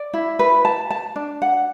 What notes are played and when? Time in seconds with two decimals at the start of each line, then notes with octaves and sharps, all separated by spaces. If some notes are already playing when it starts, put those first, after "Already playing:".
Already playing: D5
0.14 E4
0.39 B4
0.65 A5
0.90 A5
1.16 D4
1.42 F#5